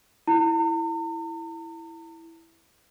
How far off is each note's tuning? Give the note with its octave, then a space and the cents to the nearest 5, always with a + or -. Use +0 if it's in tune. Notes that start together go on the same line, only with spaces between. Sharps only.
E4 +0 A#5 -45